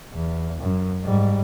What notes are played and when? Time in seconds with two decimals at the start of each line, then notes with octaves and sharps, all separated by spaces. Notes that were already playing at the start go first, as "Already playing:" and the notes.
0.14 E2
0.61 F#2
1.03 G#2 G3